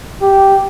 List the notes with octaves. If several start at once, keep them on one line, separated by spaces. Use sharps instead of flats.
G4